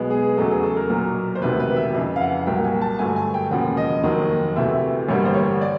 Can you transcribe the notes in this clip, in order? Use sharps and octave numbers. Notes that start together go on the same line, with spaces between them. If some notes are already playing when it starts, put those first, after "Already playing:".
Already playing: B1 B2 G#3 B3
G#4
E2 C#3 F#3 A3 A4
G#4
A4
A#4
B1 A#2 F#3
C5
E1 D2 C3 D#3 B4
B4
E5
F2 C#3 E3
F5
F#5
C2 A#2 F#3 A#3 G5
G#5
A5
G2 D3 F#3 A3 G#5
G#5
G5
E1 D#2 C#3 F3 F#5
D#5
F1 D#2 D#3 F#3
D2 C3 E3 A3 E5
A1 G2 D3 G3 A#3 C#5
C5
C#5
D5